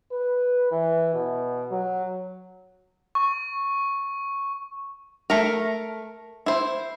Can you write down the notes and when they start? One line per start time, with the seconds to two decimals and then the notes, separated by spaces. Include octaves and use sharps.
0.12 B4
0.71 E3
1.14 B2
1.71 F#3
3.15 C#6
5.30 A3 A#4
6.46 E4 C5